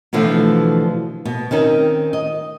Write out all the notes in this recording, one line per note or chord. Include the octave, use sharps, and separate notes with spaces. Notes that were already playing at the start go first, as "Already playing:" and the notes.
B2 D3 E3 F3 A3
B2
D#3 C4 C#4 D#4
D#5